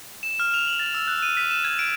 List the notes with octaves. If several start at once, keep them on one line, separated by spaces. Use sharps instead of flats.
E7
F6
F7
F#7
A6
E6
F#6
D#7
B6
E7
G#6
D7